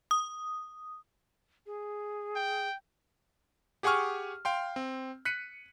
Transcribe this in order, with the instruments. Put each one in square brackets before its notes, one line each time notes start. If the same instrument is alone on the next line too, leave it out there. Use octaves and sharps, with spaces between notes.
[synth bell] D#6
[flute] G#4
[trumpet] G5
[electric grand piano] G4 G#4 F#5 G#5 C#6 F6
F5 G5 C6
C4
F#6 B6 C#7 D#7